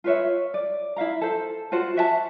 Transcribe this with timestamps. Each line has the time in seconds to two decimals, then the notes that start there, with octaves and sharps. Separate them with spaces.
0.04 F4 B4 C#5 E5
0.54 D5
0.96 E4 E5 F5 A#5
1.21 A4 C5
1.72 F4 F#4 C5 F#5
1.96 F#4 E5 F#5 A5